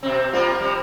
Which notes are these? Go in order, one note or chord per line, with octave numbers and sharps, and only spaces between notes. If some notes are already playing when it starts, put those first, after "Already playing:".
B2 C4
G3 A#3 F4
C3 G3